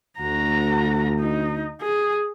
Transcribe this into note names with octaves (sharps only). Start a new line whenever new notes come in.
D2 F#4 A#5
D#4
G#4